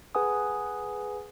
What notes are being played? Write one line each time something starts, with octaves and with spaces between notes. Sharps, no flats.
G#4 B4 F#5 G#5 D#6